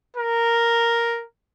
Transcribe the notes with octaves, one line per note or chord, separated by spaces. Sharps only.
A#4